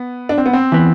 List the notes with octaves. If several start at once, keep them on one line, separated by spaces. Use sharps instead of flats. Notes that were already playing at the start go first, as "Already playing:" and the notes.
Already playing: B3
D4
C4
B3
C4
E3 B3